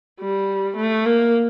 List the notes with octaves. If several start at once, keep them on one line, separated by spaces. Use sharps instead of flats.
G3
A3
A#3